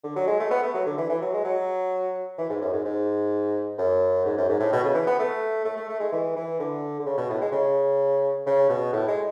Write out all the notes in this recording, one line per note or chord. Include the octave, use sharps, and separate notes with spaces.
D3
F#3
G#3
A3
B3
A3
F#3
D3
E3
E3
F#3
G#3
F#3
E3
G#2
F#2
G#2
G#2
F#2
G#2
F#2
G#2
A2
B2
C#3
E3
B3
A3
A3
A3
A3
G#3
E3
E3
D3
D3
C#3
B2
A2
G#3
C#3
C#3
B2
A2
G#3